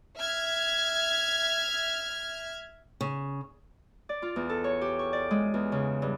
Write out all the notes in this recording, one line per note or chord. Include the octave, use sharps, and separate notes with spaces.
E5 F6 G#6
C#3
D5
F4
E2
A4
C#5
G4
C#6
D5
G#3
E2
C#3
G2